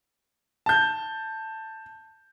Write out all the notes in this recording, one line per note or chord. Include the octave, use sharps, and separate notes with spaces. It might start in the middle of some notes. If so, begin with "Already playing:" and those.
A5 G6